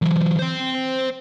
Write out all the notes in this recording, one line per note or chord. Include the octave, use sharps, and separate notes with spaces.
E3 F#3
C5 G5